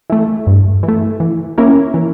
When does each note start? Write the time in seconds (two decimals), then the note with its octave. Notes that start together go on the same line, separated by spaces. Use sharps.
0.10 E3 A3
0.47 G2
0.83 E3
0.88 A3
1.20 E3
1.58 A#3 C#4 E4 A#4
1.94 E3